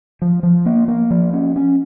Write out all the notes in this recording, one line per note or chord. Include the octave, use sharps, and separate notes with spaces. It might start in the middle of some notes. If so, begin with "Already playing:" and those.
F3
F3
A#3
A#3
F3
C#4
C#4